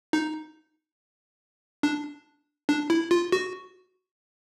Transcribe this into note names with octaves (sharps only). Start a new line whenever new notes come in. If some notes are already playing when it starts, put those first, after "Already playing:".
D#4
D4
D4
E4
F4
F#4